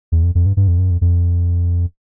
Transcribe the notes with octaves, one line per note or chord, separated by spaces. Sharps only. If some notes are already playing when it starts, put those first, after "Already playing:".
E2
F2
F2
G2
G2
F2
F#2
F2
F2